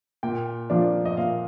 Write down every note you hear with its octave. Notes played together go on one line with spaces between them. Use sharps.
A#2 G5
F3 A#3 D4 F4
D#5
A#2 F5